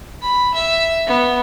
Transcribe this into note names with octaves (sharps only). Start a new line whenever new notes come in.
B5
E5
B3